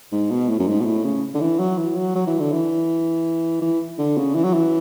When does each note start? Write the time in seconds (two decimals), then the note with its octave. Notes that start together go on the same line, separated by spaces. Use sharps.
0.12 G#2
0.31 B2
0.49 A2
0.59 F#2
0.68 G#2
0.81 B2
0.85 A2
1.05 C#3
1.35 D3
1.41 E3
1.59 F#3
1.78 E3
1.96 F#3
2.15 F#3
2.27 E3
2.39 D3
2.52 E3
3.62 E3
3.98 D3
4.17 C#3
4.35 E3
4.44 F#3
4.53 E3